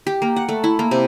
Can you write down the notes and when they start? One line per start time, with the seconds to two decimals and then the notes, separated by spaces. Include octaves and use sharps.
0.07 G4
0.22 A#3
0.36 F#5
0.49 A3
0.64 E4
0.79 A#3
0.91 C3